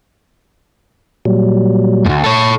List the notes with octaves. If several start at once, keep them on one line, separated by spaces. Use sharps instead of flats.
A#2 F#3 G3
D2 G#2
A4 C#5